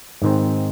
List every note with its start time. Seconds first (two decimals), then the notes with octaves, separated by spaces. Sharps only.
0.22 G#2 D#3 G#3 C4